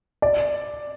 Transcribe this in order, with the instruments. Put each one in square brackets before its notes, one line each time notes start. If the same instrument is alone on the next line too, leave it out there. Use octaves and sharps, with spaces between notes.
[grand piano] D5